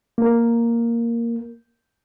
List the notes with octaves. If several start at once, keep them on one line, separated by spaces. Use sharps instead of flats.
A#3 A#4